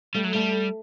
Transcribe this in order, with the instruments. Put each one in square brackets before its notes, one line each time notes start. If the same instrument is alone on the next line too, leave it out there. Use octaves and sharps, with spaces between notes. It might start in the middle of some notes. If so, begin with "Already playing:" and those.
[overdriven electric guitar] G3 [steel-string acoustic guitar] A3
[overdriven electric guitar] F#3
[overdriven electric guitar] G3 [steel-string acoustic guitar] A3